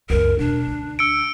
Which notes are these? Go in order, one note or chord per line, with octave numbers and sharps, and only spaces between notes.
C#2 F#2 A#4
E1 D4
D2
E6 C#7 D7